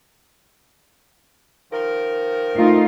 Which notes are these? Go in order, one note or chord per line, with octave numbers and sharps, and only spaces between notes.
D#3 F3 A#4
A3 D#4 F4